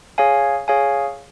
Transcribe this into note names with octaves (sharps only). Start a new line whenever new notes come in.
G#4 C#5 F5 G#5
G#4 C#5 F5 G#5